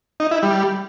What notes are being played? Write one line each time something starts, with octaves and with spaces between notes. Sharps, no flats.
D#4
E4
G3